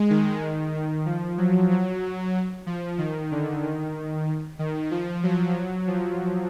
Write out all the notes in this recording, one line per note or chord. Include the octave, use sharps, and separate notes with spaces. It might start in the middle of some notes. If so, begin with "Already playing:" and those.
Already playing: G#3
D#3
D#3
F3
F#3
F#3
F3
D#3
D3
D#3
D#3
F3
F#3
F3